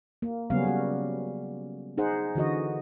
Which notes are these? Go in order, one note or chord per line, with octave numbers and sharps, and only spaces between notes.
A#3
C#3 F#3 G3 B3 C#4 F5
G3 F#4
D#4 G#4 C5 F#5
D3 E3 F#4 D#5